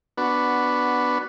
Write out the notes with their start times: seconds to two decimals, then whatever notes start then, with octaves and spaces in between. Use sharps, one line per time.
0.18 B3 D4 F#4 B4